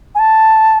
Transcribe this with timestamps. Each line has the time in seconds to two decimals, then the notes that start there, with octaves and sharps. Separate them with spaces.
0.15 G#5
0.19 A5